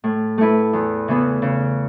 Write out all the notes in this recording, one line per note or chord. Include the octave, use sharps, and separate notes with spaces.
A2
A3 E4 B4
E2
C#3 E3 B3
C#3